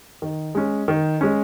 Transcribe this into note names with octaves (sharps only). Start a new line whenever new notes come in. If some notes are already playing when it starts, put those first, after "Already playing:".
D#3
G#3 C#4
D#3
G#3 C#4